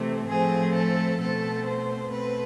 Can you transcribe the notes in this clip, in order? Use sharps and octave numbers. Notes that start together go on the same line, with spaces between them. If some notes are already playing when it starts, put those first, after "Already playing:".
Already playing: C3 E3 A3 C4
A2 F3 A3 C4 G#4
A4
B2 A3 C4 A4
C5
B2 A3 C4 B4